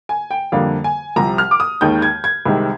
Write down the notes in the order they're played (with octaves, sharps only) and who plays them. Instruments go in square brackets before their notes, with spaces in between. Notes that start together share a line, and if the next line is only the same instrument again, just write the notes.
[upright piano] G#5
G5
F2 D3 G3 A#3 F5
G#5
C2 C3 F3 A#5
F6
D6
D#6
D#2 D#3 G#3 G6
G#6
G#6
C2 C3 D#3 G#3